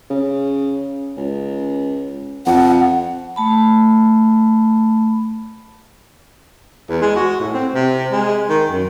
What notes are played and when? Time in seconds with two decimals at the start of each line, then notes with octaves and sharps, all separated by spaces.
0.10 C#3
1.17 C#2
2.46 F2 F#5
3.36 A3 A5 B5
6.89 E2
7.01 G#3
7.16 F#4
7.40 A2
7.53 C4
7.74 C3
8.12 G#3
8.49 D#3
8.71 F#2